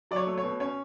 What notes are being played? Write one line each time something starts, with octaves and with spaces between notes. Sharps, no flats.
F#3 D5
C#5
A3
C#5
B2
C#4 C#5